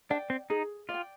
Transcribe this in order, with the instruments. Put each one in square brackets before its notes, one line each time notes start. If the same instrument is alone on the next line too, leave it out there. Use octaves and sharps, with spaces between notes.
[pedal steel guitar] D4 [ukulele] D5 G5
[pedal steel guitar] C4
[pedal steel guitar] D#4 [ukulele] G#4
[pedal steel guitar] F4 [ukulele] D5
[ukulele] G5